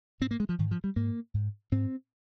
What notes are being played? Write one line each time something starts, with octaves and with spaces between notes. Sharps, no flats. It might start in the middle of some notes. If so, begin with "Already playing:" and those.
G#2 C4
A#3
G#3
F3
G#2 D#3
F3
G3
G#2 A#3
G#2
G#2 C4